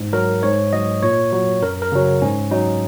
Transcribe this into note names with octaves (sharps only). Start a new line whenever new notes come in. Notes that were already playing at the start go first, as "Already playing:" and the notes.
Already playing: G#2
F#3 A#4
G#2 C#5
F#3 D#5
A#2 C#5
F#3
F#2 A#4
A#4
C#3 F#3
G#2 C#4
F#3 D#4